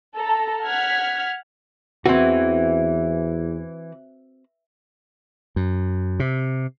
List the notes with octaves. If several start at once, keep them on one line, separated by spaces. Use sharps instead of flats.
A4 A#5
F#5 F6 G#6 B6
E2 E3 C4 F#4
F#2
C3